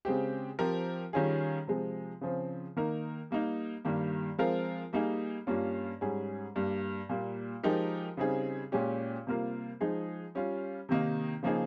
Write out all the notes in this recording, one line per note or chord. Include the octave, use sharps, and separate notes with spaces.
C#3 G#3 C4 G4
F3 C4 G4 A#4
D#3 G3 C#4 F4 G#4
C3 F3 G#3
C#3 F3 C4
D#3 A#3 D#4 A#4
G3 A#3 D#4
G2 D#3 G3 A#3
F3 G#3 C4 F4 A#4
G3 A#3 D#4 G#4
G2 G3 A#3 C#4 F4
G#2 G3 C#4 G#4
G2 G3 A#3
A#2 G3 A#3
F3 G#3 D#4 G4 A#4
C#3 G3 C4 D#4 G#4
A#2 G#3 C#4 G4
C3 G3 A#3 F4 A#4
F3 G#3 D#4 G#4
G3 C#4 F4
C3 D#3 A#3 D#4
C#3 F3 A#3 D#4 G#4